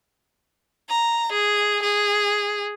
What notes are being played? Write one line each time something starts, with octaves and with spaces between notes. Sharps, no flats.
A#5
G#4
G#4